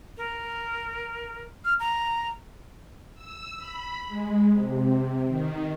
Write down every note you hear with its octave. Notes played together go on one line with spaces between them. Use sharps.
A#4
F6
A#5
E6
B5
G#3
C3
D#3